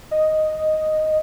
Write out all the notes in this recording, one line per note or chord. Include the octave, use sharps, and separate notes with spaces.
D#5